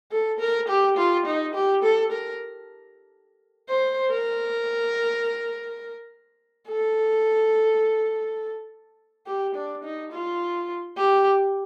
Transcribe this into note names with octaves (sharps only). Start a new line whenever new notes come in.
A4
A#4
G4
F4
D#4
G4
A4
A#4
C5
A#4
A4
G4
D4
D#4
F4
G4